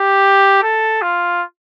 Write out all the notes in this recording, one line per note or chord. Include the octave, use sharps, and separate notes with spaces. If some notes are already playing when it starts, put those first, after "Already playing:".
Already playing: G4
A4
F4